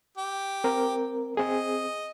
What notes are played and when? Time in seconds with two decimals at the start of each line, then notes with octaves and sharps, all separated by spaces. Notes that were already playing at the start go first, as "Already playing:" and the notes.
0.17 G4
0.64 C4 A#4
1.37 C4 G#4 D#5